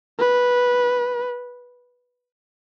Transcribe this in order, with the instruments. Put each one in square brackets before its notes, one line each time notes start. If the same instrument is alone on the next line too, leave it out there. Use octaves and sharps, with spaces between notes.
[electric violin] B4